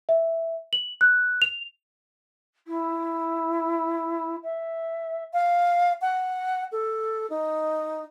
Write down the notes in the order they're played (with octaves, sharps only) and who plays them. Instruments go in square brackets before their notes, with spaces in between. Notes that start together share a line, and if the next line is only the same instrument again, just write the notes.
[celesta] E5
F#7
F#6
F7
[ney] E4
E5
[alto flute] F5
F#5
A4
D#4